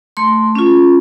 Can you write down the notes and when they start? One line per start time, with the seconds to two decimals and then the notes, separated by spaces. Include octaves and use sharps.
0.17 A3 C6
0.55 C#4 F4